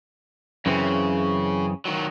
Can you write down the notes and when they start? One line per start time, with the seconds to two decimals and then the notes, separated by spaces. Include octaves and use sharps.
0.66 F#2 C#3 E3 C4
1.85 D#3 F#3